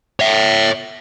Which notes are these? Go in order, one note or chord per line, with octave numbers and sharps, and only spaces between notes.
C#5 E5